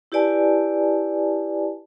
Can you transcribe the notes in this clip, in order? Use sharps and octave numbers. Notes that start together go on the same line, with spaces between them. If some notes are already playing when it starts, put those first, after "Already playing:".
E4 G4 B4 D5 G#5 A5